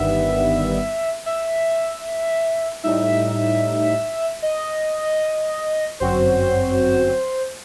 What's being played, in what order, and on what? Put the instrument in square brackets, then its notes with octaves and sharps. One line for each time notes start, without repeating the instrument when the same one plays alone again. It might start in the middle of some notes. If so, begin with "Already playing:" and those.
Already playing: [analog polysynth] G1 G2 D#3 G3 B3 [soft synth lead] E5
[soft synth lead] E5
[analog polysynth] A2 G3 D#4 [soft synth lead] E5
[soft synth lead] D#5
[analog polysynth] G1 F#2 F#3 C4 F#4 [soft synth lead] C5